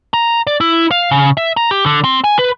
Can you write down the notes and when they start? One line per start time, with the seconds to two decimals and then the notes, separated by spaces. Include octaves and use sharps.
0.14 A#5
0.47 D5
0.61 E4
0.91 F5
1.11 C#3
1.37 E5
1.57 A#5
1.71 G4
1.86 D3
2.04 C4
2.24 G#5
2.39 B4